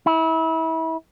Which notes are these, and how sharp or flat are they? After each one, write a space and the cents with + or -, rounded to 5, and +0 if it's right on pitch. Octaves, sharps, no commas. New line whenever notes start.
E4 -30